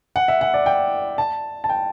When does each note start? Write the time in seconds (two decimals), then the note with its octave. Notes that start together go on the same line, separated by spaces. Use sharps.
0.16 F#5
0.28 E5
0.41 F#5
0.54 D5
0.66 G5
1.18 A5
1.64 A5
1.69 G5